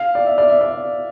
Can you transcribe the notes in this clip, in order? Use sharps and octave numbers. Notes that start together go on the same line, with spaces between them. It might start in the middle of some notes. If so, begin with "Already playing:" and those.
Already playing: F5
D5
E5
D5
E5
D5